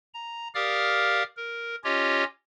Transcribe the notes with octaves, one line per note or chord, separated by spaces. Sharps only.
A#5
G4 A#4 D5 F5 D#6 F6
A#4
C#4 F4 G4 C#5 D#5